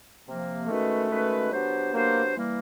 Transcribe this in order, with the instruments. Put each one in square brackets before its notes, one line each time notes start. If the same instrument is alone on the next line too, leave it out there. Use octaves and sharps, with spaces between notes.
[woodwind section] C3 F3 A#3
[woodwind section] D#3 G#3 C#4 F#4 B4 [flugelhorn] A3
[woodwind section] D#3 G#3 C#4 F#4 B4
F#3 B3 D4 G4 C5
[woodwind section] F#3 B3 D4 G4 C5 [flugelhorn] A#3
[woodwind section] E3 G3 A#3